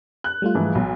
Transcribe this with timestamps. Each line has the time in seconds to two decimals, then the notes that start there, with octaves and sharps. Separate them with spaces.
0.24 F#6
0.42 G3 A3 F4
0.55 G#2 E3 F3
0.75 B1